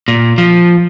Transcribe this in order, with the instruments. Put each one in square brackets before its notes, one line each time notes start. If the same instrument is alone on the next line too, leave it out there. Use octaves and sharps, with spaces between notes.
[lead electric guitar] A#2
F3